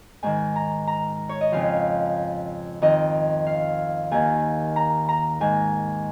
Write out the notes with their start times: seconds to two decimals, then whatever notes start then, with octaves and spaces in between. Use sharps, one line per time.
0.23 G#2 D#3 G#5
0.56 A#5
0.87 A#5
1.29 C#5
1.41 D#5
1.52 F2 C#3 F3 F5
2.82 F2 D#3 D#5
3.47 F5
4.11 D#2 D#3 G#5
4.76 A#5
5.09 A#5
5.41 G#2 D#3 G#5